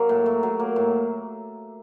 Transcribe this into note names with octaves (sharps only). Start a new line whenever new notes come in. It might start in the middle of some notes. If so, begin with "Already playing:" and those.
Already playing: F#3 A#3 A#4
A2
A2
F#3
A#3
A2